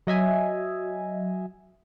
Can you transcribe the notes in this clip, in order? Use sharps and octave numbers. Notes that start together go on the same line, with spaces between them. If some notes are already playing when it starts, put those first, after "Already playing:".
F#3 D#5 E5 G#5